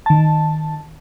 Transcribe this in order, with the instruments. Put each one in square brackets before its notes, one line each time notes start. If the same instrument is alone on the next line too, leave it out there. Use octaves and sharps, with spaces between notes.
[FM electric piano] D#3 A5